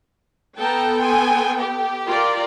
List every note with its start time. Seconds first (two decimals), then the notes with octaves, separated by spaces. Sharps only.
0.58 B3 A4 G5 A5 A#5
1.00 G#5 C6
1.59 G4
2.07 F4 A#4 D5